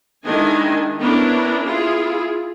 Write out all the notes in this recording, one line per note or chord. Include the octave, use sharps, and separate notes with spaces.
D#3 G#3 D4 E4 D#5 G#5
B3 C#4 D4 E4 A#4
E4 F4 G#4